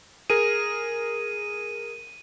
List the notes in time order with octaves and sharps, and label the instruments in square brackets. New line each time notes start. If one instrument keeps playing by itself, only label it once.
[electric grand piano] G#4 A#4 [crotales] D#7